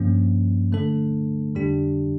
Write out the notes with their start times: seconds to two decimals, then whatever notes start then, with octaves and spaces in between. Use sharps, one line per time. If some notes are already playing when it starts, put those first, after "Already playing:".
Already playing: G2 F3 A#3 C#4
0.72 D3 A3 D4 A4
1.55 F2 D3 G3 D4 G4